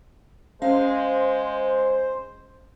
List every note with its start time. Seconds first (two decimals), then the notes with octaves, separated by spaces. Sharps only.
0.62 G#3 C#4 C5 F5